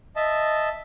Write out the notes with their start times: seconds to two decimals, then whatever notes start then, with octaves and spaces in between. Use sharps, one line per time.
0.16 D#5 E5 A5